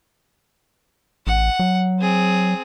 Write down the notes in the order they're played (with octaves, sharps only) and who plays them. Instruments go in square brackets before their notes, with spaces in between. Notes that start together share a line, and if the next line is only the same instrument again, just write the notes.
[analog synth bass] A1 [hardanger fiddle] F#5
[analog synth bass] F#3
[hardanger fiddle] C4 G#4